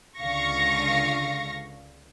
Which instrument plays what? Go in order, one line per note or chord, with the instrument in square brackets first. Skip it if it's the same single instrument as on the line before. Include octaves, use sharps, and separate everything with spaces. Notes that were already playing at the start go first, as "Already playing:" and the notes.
[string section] C#2 D3 F5 C#6 A#6